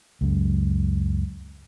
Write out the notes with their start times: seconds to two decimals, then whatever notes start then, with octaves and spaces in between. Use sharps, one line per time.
0.21 C#2 F#2